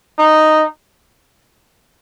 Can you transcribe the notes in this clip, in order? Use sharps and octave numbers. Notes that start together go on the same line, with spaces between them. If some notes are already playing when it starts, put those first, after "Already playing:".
D#4